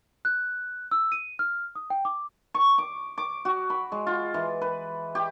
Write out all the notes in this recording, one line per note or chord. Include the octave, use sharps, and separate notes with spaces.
F#6
E6
D#7
F6
D#6
G5
D6
C#6
D6
D6
F#4
B5
G#3
F4
E3
B4
G4